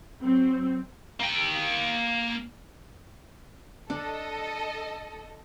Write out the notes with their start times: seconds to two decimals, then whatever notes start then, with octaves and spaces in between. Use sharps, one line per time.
0.22 F#3 C4
1.20 A#3 G5
3.90 D4 A4 D#5